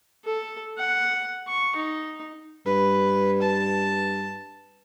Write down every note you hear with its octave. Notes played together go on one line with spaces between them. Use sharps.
A4
F#5
C#6
D#4
G2 B4
A5